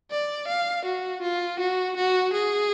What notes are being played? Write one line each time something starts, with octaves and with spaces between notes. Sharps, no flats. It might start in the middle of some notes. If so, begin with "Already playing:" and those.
D5
F5
F#4
F4
F#4
F#4
G#4